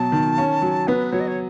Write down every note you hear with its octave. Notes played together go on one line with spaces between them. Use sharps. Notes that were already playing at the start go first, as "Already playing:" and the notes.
Already playing: B2 F#3 A5
D#3
C#4
F#3
B3 B4
F#3 C#5
D#5
C#5